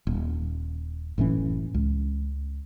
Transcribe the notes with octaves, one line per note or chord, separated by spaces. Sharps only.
D#1
F#1 A2 E3 C#4
C#2